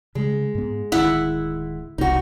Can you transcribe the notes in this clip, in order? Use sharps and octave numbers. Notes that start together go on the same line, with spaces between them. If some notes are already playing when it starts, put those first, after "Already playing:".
C#3 G3 G#3
G#2 B3
D1 D2 D#3 E4 F#5
E1 C2 D#4 F#4